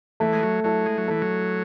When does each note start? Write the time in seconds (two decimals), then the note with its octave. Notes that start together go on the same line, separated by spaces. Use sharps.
0.20 E3 A3
0.33 G#3
0.43 F#3
0.64 F#3 E4 A4
0.86 G#3
0.98 F#3
1.08 E3 A3
1.22 F#3